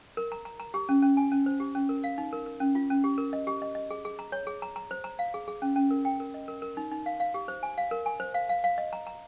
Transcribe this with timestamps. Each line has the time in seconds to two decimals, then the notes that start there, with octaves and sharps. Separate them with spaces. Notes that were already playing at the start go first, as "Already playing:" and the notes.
0.17 A#4
0.32 A#5
0.45 A#5
0.60 A#5
0.74 G4
0.89 C#4
1.02 C#4
1.17 G#5
1.32 C#4
1.46 C5
1.60 G4
1.75 C#4
1.89 A#4
2.04 F5
2.18 D#4
2.33 A#4
2.46 A#4
2.60 C#4
2.75 F4
2.90 C#4
3.04 G4
3.18 A#4
3.33 D#5
3.47 G4
3.62 D#5
3.75 D#5
3.91 G#4
4.05 G#4
4.19 A#5
4.32 C#5
4.47 G#4
4.62 A#5
4.76 A#5
4.91 C5
5.04 A#5
5.19 F5
5.34 G#4
5.48 G#4
5.62 C#4
5.76 C#4
5.91 A#4
6.05 G5
6.20 A#4
6.34 D#5
6.48 A#4
6.62 A#4
6.77 D#4
6.92 D#4
7.06 F5
7.20 F5
7.34 G4
7.48 C5
7.63 G#5
7.78 F5
7.91 A#4
8.06 G#5
8.20 C5
8.34 F5
8.49 F5
8.64 F5
8.78 D#5
8.93 A#5
9.07 A#5